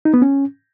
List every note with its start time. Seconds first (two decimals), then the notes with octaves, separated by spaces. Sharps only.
0.05 D#4
0.14 B3
0.22 C#4